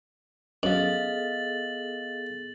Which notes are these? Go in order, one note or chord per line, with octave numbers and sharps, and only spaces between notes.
F#2 B3 G#4 A4 D#5 F5 A6 F#7